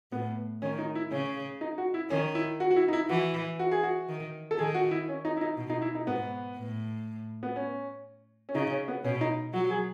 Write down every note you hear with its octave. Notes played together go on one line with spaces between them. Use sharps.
A2 B3
D#3 C#4
D#4
E4
C#3 C#4
D#4
F#4
E4
D#3 C#4
E4
F#4
F#4
E4
D#4
E4
E3 F#4
F#4
G#4
F#4
D#3
A4
D#3 G#4
F#4
E4
C#4
D#4
E4
D#4
B2
D#4
E4
D#4
G#2 B3
A2
B3
C#4
C#4
C#3 D#4
C#4
B3
B2 C#4
D#4
F#3 F#4
G#4